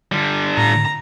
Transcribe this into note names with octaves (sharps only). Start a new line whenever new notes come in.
D3 G3
A2 A#5